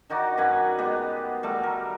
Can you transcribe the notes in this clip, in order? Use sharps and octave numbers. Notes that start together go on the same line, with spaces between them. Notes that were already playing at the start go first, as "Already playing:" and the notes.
D#3 D#4 F#4 D5
F#2 B4 F#5 G#5
G#3 B3 G4
G3 A3 F#4
A#4